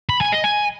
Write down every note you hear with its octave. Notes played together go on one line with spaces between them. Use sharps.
B5
G#5
D#5
G#5